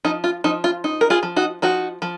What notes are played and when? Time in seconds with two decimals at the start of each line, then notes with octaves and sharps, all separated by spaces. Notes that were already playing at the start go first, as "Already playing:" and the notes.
0.05 F3 D#4
0.24 F4
0.44 F3 D#4
0.64 F4
0.84 D#4
1.01 A#4
1.10 F4 G#4
1.23 F3
1.36 D#4 F#4
1.62 F3 D#4 F#4
2.02 F3